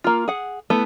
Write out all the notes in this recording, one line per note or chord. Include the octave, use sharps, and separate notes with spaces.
A#3 F4
G#4 F#5
A3 B3 E4